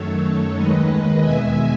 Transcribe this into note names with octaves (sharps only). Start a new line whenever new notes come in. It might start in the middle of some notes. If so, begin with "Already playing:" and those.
Already playing: F#2 D#3 F#3 A3 A4 C#5
D#2 D#3 G#3 B4 D#5
E2 B2 G#3 E5 G#5